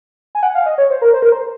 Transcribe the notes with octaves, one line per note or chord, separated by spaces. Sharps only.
G#5
F#5
F5
D#5
C#5
C5
A#4
C5
A#4
C5